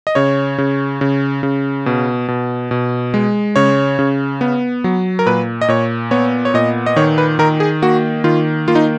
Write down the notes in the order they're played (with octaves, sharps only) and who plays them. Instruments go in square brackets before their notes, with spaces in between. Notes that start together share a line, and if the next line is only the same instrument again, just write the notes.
[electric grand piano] D#5
C#3 C#5
C#3
C#3
C#3
B2
B2
B2
G#3
C#3 C#5
C#3
B3
F#3
A#4
A#2 B4
D#5
A#2 C#5
B3 C#5
C#5
A#2 D#5
D#5
D#3 C#5
B4
D#3 A#4
G#4
A#3 F#4
D#3 F4
A#3 F4
D#4